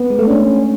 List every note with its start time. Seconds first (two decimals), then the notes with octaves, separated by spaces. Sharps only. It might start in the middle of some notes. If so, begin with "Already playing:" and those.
Already playing: B3
0.10 G#3
0.19 A3
0.28 C#4 D4